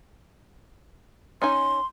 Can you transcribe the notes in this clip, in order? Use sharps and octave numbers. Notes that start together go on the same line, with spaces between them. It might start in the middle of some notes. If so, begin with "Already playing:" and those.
C#4 D#4 G#5 C6